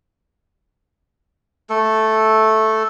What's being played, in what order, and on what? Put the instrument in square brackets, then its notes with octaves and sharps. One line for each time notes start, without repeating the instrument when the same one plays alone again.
[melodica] A3 A4